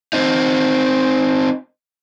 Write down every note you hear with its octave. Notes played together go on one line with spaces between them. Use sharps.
C4 D#4